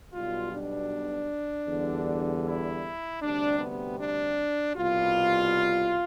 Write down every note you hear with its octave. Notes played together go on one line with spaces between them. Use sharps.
B1 B2 G3 F4
D4
E2 D3 G3
E4
D2 C3 G3 D4
B3
D4
C2 B2 G3 F4